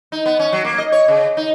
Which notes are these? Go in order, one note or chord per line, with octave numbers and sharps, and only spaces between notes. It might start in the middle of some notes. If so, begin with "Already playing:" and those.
D#4
B3
C#4
F#3
A#3
D#5
C#5
C#3
D#4